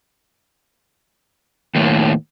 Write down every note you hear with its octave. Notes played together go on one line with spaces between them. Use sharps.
D#2 A2